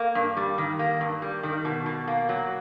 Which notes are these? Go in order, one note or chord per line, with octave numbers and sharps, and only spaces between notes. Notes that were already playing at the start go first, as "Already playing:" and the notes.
Already playing: A#3
G2
G3
D#3
A#3
G2
G3
D#3
B2
B2
A#3
F#3